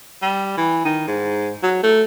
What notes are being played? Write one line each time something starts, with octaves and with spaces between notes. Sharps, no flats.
G3
E3
D#3
G#2
F#3
A3